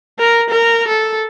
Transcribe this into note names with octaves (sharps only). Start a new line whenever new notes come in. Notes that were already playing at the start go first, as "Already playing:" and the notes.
A#4
A#4
A4